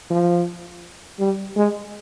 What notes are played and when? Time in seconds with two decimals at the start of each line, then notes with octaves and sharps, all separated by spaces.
0.10 F3
1.19 G3
1.56 G#3